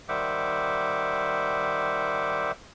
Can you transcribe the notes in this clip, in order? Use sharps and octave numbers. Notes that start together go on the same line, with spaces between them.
D#3 G3 C5 E5 F#5 D6